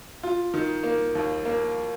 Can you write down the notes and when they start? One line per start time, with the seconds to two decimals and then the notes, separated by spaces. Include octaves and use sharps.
0.23 F4
0.54 D#3
0.83 A#3
1.15 D#2
1.45 A#3